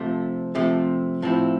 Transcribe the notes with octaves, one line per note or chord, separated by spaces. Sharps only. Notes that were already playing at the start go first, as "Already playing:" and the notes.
Already playing: C3 F3 A3
C3 F3 A3
A2 F3 C4 E4